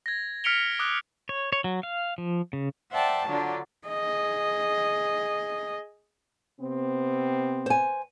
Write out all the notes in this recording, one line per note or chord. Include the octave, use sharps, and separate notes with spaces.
G#6 A#6
F6 B6 C#7 D7 F7 G7
D6 D#6 F#6
C#5
C#5
F#3
F5
F3
C#3
C5 D5 E5 F#5 G5 A5
D3 F#3 D4 F4 D5
G#4 D#5
C3 B3 C4
C5 G#5